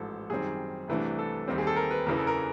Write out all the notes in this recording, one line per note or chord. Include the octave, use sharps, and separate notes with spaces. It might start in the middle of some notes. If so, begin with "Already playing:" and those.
Already playing: A1 G#2 F3 A4
F#2 D#3 G3 C4 G#4
C2 C3 E3 A3 D4
A4
D#2 D#3 G3 C4
G#4
A4
A#4
B4
F#1 E2 C#3 E3 A#4
A4
A#4